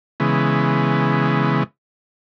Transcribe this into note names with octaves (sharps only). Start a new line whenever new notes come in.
C#3 E3 G#3 B3